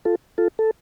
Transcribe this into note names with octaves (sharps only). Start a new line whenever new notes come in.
F4 A4
F4 A4
A4